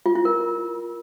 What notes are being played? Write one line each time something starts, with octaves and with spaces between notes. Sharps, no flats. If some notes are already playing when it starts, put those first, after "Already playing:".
F4
E4
A#4